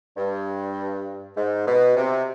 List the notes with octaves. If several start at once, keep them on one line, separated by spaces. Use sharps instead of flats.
G2
G#2
B2
C3